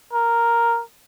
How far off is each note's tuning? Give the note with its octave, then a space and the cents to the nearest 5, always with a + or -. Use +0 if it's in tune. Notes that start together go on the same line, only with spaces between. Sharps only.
A#4 +0